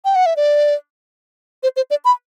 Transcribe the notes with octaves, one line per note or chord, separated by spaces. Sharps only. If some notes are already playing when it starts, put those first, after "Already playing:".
G5
F#5
E5
D5
C5
C5
D5
B5